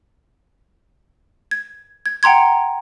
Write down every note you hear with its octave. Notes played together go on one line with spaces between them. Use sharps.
G#6
G#6
F#5 G5 A#5 C6 G#6